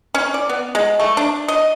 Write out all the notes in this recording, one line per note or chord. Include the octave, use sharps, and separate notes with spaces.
C#4
D5
B3
G#3
A3
D4
D#5